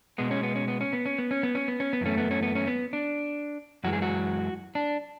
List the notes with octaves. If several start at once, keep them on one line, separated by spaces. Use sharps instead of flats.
B2 G#3 B3
C#4
B3
C#4
B3
C#4
B3
C#4
B3
C#4
B3
C#4
B3
C#4
B3
F#2 E3 A3 C#4
B3
C#4
B3
C#4
B3
D4
F#2 E3 G#3 F#4
G#4
F#4
D4